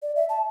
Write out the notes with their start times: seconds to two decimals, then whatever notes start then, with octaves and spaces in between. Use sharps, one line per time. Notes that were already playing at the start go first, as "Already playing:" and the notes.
0.02 D5
0.16 E5
0.29 A5